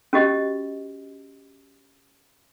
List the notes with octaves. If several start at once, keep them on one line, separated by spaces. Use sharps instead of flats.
C#4 F#4 G4 D#5